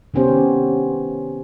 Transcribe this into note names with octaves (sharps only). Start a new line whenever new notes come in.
C3 D#3 B3 C#4 G4 C5